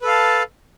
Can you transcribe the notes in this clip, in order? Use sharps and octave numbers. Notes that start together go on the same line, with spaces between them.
A4 B4 F5 A5